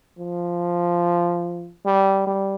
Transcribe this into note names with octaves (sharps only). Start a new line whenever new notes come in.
F3
G3
G3